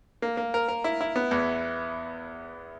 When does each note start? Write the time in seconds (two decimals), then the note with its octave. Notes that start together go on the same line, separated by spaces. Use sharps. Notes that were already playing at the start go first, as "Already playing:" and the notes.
0.22 A#3
0.37 A#3
0.54 A#4
0.68 A#4
0.84 E4
1.01 E4
1.16 B3
1.31 E2